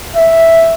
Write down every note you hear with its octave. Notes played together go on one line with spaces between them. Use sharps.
E5